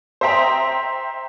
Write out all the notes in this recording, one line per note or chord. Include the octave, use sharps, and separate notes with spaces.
C5 D#5 E5 G5 A#5